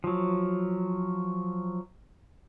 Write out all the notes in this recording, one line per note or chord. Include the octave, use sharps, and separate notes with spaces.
F3 F#3